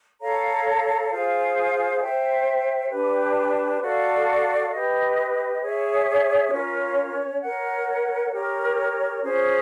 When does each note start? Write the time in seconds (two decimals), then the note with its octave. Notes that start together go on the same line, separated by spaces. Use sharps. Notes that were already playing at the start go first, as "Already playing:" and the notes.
0.20 A4 C#5 F5 A#5
1.11 F4 G#4 C5 F5
2.01 C5 E5 G5
2.91 D4 G4 B4
3.81 F#4 A4 D5 F5
4.71 G4 B4 D#5
5.61 G#4 C#5 E5
6.51 C#4 F4 A#4 C#5
7.41 A#4 C#5 F#5
8.31 G4 A#4 C#5
9.23 C#4 F4 G#4 C5